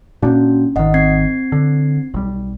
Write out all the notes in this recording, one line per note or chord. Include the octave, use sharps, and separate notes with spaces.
A#2 A#3 C#4 D4 F#4
G#1 D#3 D#5 F#5
C4 G#6 C7
D3
B1 G3